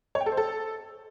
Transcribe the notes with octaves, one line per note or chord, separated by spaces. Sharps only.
C#5
G5
A4
C5
A4